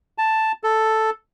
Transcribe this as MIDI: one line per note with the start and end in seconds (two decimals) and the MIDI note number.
0.18 0.52 81
0.64 1.10 69